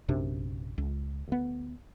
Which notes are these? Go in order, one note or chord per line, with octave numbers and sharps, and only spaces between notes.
A#1 F#2 C3 D4
C#2
D2 B3